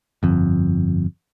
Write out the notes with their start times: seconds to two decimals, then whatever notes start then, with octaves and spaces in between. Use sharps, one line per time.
0.23 G1 F2